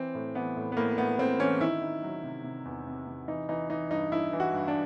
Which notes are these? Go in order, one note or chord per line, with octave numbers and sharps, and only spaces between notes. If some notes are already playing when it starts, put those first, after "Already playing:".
Already playing: E3 C4
A2
E3 B3
A2
B3
A2 A#3
A2 B3
A2 C4
E3 C#4
D#3 E4
D#3
F#3
C3
C3
E2
C3
C3
E3 D#4
E3 D#4
E3 D#4
G2 D#4
G2 E4
E3
F#4
G2
D4